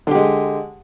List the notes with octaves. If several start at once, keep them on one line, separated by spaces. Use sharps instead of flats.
D3 G#3 G4